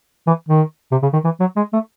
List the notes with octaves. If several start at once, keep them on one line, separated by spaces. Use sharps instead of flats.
E3
D#3
C3
C#3
D#3
E3
F#3
G#3
A3